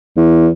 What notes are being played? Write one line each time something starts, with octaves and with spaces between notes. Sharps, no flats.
E2